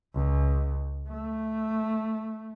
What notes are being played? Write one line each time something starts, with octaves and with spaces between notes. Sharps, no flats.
C#2
A3